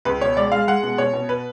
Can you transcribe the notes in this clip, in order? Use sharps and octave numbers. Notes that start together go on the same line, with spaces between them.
C#2 B4
B2 C#5
G#3 D5
G#3 F5
G#3 F#5
B2
B2 C#5
B2
B4